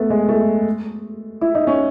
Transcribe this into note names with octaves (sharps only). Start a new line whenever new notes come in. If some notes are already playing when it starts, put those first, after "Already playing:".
Already playing: A3 B3
G#3
A3
E4
D#4
C#4